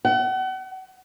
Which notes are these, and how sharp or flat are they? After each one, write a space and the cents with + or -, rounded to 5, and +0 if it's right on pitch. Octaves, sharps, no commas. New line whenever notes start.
F#5 +40